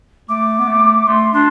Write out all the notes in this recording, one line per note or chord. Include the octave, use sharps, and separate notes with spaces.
A3 D6
B3
A3
A3 C6
D4 C6